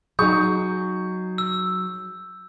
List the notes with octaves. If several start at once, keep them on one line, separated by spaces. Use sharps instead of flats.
F#3 D#4 G#4 C#6 G6
E6